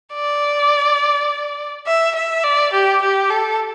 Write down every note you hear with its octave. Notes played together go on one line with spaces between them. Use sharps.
D5
E5
E5
D5
G4
G4
A4